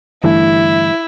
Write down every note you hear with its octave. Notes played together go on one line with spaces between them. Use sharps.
G1 G2 E3 A3 E4